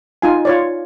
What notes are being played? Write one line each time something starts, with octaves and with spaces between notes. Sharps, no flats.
D#4 F4 G#5
F4 C#5 D5